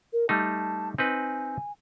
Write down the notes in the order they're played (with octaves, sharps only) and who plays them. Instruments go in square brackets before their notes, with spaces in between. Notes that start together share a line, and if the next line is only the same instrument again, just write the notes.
[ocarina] A#4
[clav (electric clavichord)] G3 A3 D#4 [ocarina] A5
[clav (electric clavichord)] C4 D#4 B4 [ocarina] G#5